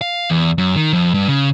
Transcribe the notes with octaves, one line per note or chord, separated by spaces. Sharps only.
F5
E2
F#2
D#3
F2
G2
C#3